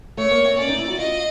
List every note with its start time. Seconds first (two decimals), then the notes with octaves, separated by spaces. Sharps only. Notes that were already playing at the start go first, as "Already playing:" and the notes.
0.17 A3 C#5
0.31 A#3
0.45 C4
0.58 C#4 D5
0.68 D#4
0.79 E4
0.88 F#4
0.98 F4 D#5